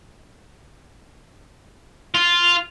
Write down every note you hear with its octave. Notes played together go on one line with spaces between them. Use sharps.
F4